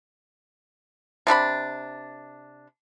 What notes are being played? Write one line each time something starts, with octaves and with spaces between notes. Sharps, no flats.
C3 D4 E4 B5